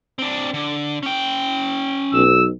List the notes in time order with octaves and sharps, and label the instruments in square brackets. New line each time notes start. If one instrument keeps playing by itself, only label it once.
[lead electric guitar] C4 D4
D3
C#4 G5
[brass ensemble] B1 [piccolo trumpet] E6